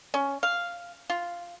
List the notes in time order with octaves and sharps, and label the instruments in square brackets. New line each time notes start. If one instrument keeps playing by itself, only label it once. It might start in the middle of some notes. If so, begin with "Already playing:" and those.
[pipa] C#4
F5
F4